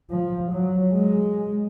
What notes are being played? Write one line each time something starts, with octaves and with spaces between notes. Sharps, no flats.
F3
F#3
G#3